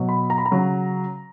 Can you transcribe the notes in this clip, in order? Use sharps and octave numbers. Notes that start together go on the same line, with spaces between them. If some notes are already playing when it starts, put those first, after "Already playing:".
Already playing: B2 F#3
B5
A#5
B5
A#5
C#3 F#3